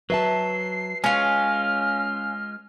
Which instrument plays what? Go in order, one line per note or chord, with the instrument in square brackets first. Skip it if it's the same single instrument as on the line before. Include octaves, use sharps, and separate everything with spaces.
[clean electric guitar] F#3 [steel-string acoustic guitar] B4 E5 A5 [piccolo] C7
[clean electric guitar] G#3 F4 [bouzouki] C#4 F5 [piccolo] F6